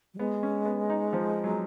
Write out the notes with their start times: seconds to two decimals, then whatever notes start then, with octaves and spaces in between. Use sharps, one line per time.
0.14 F#3
0.18 G#3 B3
0.43 C#4
0.65 B3
0.90 D#4
1.13 F3
1.44 F#3